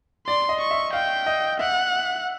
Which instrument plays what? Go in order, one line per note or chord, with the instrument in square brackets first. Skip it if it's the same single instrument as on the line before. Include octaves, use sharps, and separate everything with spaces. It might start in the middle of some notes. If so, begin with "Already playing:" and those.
[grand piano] D5 [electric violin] C6
[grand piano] D#5
[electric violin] C#6
[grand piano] E5
[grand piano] F5 [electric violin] G5
[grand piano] D#5
[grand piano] E5 [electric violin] F#5